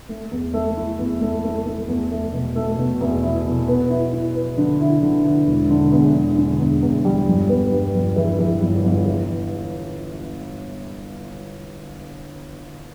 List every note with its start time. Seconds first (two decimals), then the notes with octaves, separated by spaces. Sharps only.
0.09 A3
0.31 E2
0.53 A3
0.77 E4
0.99 E2
1.21 A3
1.44 A3
1.66 A3
1.88 E2
2.11 A3
2.33 B2
2.56 A3
2.79 B2
3.01 E2
3.23 E4
3.46 B2
3.68 B3
3.90 E4
4.13 E4
4.35 B4
4.57 D3
4.80 E4
5.02 D3
5.25 E4
5.47 E1
5.70 D3
5.92 E2
6.14 D3
6.37 D3
6.59 E2
6.82 E2
7.05 G3
7.27 G1
7.49 B3
7.72 G2
7.94 G1
8.16 E3
8.39 E3
8.61 G1
8.84 G1
9.06 E3